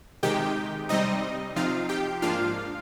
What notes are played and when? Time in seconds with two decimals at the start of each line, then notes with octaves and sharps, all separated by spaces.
0.23 C3 D#3 G#3 D#4 G4 G5
0.89 C3 G3 C4 D#4 D#5
1.56 C3 F3 C4 D#4 F4 F5
1.89 G4 G5
2.22 G#2 F3 A#3 D4 F4 F5